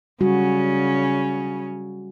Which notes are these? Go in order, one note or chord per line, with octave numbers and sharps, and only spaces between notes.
C#3 G3 C#4 F#4